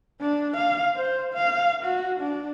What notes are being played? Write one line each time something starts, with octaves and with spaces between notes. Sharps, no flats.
D4
F5
C5
F5
F#4
D4